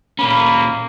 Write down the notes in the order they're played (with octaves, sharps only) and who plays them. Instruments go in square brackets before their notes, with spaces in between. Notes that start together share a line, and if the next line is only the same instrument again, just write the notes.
[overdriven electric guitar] A#2 C#4 [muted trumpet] A#3 [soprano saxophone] B5